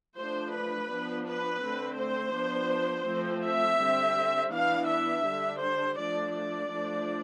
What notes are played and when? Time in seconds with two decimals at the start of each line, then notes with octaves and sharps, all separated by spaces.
0.18 F3 A3 D4 C5
0.53 B4
0.90 F3 B3 D4
1.26 B4
1.63 D3 A3 C4
1.99 C5
2.35 F3 B3 D4
3.07 F3 A3 C4
3.44 E5
3.81 D3 G3 C4
4.52 E3 B3 D4 F5
4.89 E5
5.26 D3 G3 D4
5.62 C5
5.97 F3 A3 D4 D5
6.34 D5
6.70 F3 A3 D4